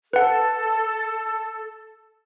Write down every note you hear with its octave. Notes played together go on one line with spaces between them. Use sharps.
A4 B4 F#5